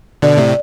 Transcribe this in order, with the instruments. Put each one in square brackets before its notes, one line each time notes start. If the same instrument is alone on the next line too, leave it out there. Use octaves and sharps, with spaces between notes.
[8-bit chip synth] B2 D3 [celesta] D5
[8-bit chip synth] A2 C3